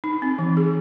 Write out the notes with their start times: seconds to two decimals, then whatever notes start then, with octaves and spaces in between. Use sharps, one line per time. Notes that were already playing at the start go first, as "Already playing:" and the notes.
0.04 D#4
0.22 C4
0.39 E3
0.57 G#4